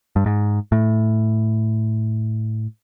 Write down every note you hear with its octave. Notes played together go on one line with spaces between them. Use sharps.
G2
G#2
A2